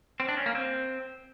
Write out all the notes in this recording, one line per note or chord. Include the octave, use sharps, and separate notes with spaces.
C4
D4
C#4
A#3
C4